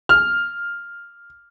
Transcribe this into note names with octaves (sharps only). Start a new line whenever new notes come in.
F6